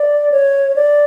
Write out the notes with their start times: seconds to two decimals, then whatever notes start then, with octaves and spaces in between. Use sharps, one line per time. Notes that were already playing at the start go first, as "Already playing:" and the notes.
Already playing: D5
0.31 C#5
0.76 D5